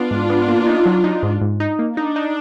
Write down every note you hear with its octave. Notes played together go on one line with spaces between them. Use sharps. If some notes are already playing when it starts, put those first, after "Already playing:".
Already playing: B3 D4 F4
G#2
B3
A#3
D#4
F#3
D#4
G#2
G#2
D#4
A#3
D4 D#4
D#4